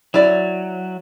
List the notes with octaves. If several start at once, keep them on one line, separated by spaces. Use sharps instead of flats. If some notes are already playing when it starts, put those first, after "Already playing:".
F#3 E4 D5